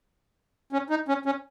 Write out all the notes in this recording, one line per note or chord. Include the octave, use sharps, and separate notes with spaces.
C#4
D#4
C#4
C#4